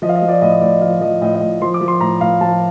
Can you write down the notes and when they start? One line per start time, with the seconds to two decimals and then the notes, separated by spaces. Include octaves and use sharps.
0.02 F3 D#5
0.09 F5
0.15 D#5
0.22 F3
0.29 D5
0.42 A2 D#5
0.52 D#5
0.61 A2 D5
0.72 D#5
0.81 F3 F5
1.01 F3 D#5
1.22 A2 D#5
1.35 D#5
1.41 A2
1.62 F3 C6
1.74 D6
1.81 F3
1.88 C6
2.01 A2 A#5
2.21 A2 F5
2.41 F3 A5